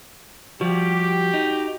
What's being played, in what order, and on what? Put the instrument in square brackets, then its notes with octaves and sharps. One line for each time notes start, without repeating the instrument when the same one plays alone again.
[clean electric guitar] F3 G3 [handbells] F#4 [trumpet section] G4
[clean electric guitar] D#4